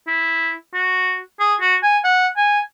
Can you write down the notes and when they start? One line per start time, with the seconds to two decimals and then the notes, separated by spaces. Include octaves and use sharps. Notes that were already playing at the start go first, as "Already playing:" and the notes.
0.07 E4
0.74 F#4
1.39 G#4
1.61 F#4
1.83 G#5
2.04 F#5
2.37 G#5